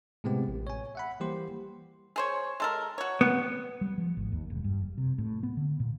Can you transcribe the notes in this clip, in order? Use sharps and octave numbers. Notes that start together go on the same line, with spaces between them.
A2 C3 G#3 B3 C4 G4
A1
C#5 G#5
E5 F#5 B5
E3 G3 A#3 G4 C5 C6
G#4 C5 C#5
G#3 A4 A#4
F#4 C#5
B3
G3
F3
G#1
D#2
E1
G2
F#1
C3
A2
B3
D3
A#2